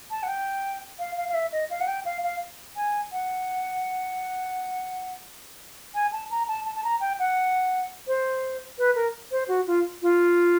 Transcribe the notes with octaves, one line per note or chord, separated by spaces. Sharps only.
A5
F#5
G5
F5
F5
F5
E5
D#5
F5
F#5
G5
F5
F5
G#5
F#5
G#5
A5
A#5
A5
A5
A5
A#5
G5
F#5
C5
B4
A#4
C5
F#4
F4
F4